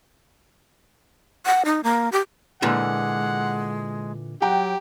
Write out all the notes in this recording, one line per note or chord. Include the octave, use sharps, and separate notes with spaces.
F#5
D#4
A#3
G4
A#2 D3 E3 G#3 F#5
F#3 G4 F#5 G5 A#5